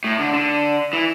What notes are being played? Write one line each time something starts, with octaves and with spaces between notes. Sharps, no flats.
A2
D3
D3
E3